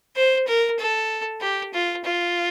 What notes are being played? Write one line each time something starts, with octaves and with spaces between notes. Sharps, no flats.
C5
A#4
A4
G4
F4
F4